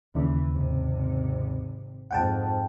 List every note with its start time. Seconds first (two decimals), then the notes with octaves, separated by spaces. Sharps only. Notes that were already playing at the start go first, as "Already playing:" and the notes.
0.15 D#2 C#3 E3
0.51 G#1 C3
2.11 F2 G#2 F#5 G5 A5